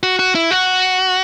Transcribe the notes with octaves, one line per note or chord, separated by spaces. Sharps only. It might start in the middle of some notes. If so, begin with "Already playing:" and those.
F#4
F#4
E4
F#4